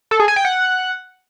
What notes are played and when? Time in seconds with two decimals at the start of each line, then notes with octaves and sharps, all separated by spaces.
0.11 A4
0.20 G#4
0.28 G#5
0.36 G5
0.45 F#5